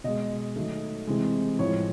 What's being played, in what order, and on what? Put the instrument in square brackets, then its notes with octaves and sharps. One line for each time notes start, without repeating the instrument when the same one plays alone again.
[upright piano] B2 G#3 D#5
D#3 F#3 A3
C3 E3 G#3
A2 F3 G#3 C#5